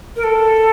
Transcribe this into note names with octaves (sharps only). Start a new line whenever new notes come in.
A#4
A4